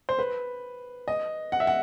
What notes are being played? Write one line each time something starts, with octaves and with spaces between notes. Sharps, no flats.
C5
B4
D#5
F#5
E5
F#5